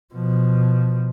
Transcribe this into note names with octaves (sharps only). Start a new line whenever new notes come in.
B2 F3